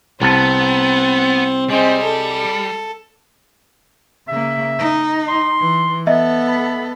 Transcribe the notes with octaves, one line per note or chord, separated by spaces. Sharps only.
C2 B3 C4 A5
G3 G#3 C4
A4
C#3 A#3 E5
D#4
C6
E3
B3 A4 D#5 E5
B5